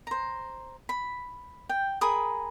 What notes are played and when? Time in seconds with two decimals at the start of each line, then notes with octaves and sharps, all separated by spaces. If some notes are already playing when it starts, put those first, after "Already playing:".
0.07 C5 A#5
0.89 B5
1.69 G5
2.01 G#4 A#4 B5 D#6